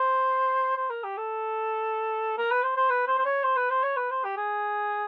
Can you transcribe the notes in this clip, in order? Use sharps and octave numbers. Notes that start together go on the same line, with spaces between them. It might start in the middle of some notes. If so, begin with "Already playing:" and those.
Already playing: C5
C5
A#4
G4
A4
A#4
B4
C5
C5
B4
C5
C5
C#5
C5
B4
C5
C#5
B4
C5
G4
G#4